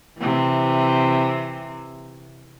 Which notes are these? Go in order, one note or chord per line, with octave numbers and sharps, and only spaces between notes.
C3 E3